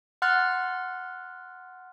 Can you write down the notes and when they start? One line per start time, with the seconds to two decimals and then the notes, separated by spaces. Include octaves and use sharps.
0.22 F#5 C6 F6 F#6 A6